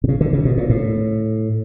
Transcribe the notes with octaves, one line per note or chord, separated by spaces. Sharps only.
C3
C#3
D3
C#3
B2
A#2
A2